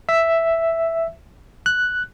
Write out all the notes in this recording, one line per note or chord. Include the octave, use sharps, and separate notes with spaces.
E5
F#6